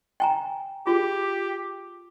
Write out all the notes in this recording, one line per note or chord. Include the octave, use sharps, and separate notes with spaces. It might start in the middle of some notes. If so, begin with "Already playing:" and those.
G5 G#5 A#5
F4 G4 G#4